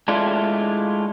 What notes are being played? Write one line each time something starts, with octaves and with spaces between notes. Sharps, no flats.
G#3 A3 D4 E4 F4